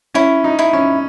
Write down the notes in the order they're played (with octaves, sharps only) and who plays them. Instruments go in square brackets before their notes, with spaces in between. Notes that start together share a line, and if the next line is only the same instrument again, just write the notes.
[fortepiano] C#4 [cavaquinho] E4
[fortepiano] D#4
[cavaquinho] E4
[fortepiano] C#4